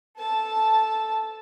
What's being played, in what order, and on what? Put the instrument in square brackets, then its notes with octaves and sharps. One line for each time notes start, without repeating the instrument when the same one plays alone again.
[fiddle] A4 A5